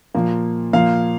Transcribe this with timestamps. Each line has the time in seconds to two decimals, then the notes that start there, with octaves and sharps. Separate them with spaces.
0.14 A#2 F3 A#3
0.73 A#2 F3 A#3 F5